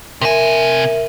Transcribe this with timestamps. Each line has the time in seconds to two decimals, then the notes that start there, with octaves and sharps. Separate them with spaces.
0.21 C3 A#4 E5 G#5